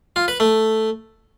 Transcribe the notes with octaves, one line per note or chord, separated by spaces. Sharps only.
F4
B4
A3